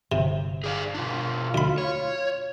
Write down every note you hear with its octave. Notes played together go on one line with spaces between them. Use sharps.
G1 C3
G#4 D5 F5
B2 D4 F4
D2 B5
C#5